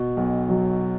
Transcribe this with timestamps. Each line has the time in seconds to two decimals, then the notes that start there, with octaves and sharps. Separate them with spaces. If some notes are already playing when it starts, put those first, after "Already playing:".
Already playing: B2
0.17 B1
0.49 F#3